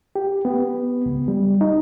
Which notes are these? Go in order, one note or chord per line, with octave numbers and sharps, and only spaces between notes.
G4
B3
C#2
G3
D#4